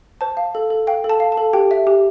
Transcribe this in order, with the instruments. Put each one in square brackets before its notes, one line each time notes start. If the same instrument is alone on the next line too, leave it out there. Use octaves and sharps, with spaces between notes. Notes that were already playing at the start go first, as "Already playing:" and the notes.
[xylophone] C5 A5
F5
A4
A4
F5 G5
A4
A5
F5
A5
A4
G4 G5
E5
G4